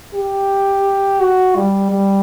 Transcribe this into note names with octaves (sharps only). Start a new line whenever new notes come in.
G4
F#4
G3
G3